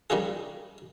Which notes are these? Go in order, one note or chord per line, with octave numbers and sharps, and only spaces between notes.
D#3 G3 C#4 D4 F4 G#4